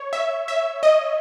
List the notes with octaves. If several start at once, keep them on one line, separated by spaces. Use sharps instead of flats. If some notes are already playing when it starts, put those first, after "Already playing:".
Already playing: C#5
E5
E5
D#5